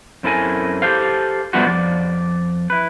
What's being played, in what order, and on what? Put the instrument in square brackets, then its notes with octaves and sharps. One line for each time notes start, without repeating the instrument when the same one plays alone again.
[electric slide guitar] F#2 C4 E4 A4 A#4 G#5
G4 A4 C5 F5
F3 G3 A3 B3 F4 F#4
F2 F3 D5
E4 B4